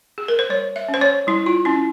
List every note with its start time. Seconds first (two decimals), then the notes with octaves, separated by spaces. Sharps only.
0.18 G#4
0.28 A#4
0.39 C5
0.49 G3 C#5
0.76 E5
0.88 C#4
0.94 C5
1.01 C#5
1.27 G3 E4
1.46 F4
1.65 C#4 E4